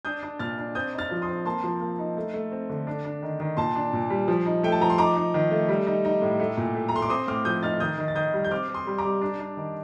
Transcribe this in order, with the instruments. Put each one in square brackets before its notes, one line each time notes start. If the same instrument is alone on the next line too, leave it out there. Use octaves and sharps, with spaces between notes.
[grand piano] D4 D#6 G6
D4
A#2 F6 A6
D4
C4 D#6 G6
D#4
F6 A6
F3
C6 D#6
C4
A#3 A5 C6
F3
A#3
D#4
A3
A3
C4
D3
D4
D4
D#3
D#3
A#2 A5 C6
D4
A#2
G3
F3
D#4
A3 G5
A5
F3 A#5
C6
D#4 A#5 D6
D#4
D#3
A3
G3
D#4
D#4
A2
A3
A#2
A3
A#5
A3 C6
D6
C4 C6 D#6
A2 D6 F6
F3 D#6 G6
D#4 F6 A6
D#3 D#6 G6
D#3
A6
D#3 D#6 G6
G3
G6
C4 D6 F6
C4
C6 D#6
G3
A#5 D6
G3
D4
D4
D#3